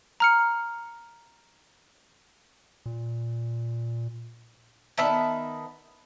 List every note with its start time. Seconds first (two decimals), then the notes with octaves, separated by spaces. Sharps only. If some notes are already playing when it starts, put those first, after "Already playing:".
0.20 A#5 F6 C#7
2.86 A#2
4.97 D#3 B3 E5 A5